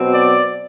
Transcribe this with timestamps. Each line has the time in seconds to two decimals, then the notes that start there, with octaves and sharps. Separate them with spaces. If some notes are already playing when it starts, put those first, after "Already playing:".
Already playing: B2 F#3 C4
0.13 D5